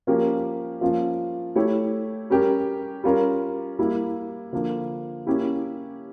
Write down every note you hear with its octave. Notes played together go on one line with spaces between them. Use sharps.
F3 A#3 C#4 G4 A#4
F3 A#3 C#4 F4
A3 E4 G4 C#5
G3 C#4 G4 A#4
G3 C#4 F4 A#4
G3 A#3 E4
D3 F3 A#3
A#3 C#4 E4 G4